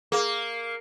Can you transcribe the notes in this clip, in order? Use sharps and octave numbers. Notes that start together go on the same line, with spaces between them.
A#3 G#4